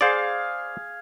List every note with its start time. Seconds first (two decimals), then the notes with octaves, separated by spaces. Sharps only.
0.01 G#4 C5 D5 F5